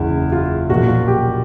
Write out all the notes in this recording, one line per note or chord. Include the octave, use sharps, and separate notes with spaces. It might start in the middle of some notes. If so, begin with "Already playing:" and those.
Already playing: F#1 E2 C#3 E4
F4
B1 A#2 F3 F#4
F4
G4